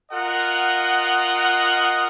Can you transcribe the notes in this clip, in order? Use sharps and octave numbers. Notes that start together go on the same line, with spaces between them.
F4 A#4 D#5 F#5